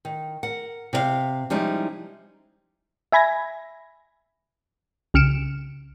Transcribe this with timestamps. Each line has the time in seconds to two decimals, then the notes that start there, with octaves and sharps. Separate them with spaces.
0.05 D#3
0.43 A#4 F#5
0.93 C3 C#5 F5
1.50 F3 G3 G#3 C#4 D#4 E4
3.12 E5 G#5 B5 G#6 A#6
5.14 C2 C#3 F6 C#7 D7 E7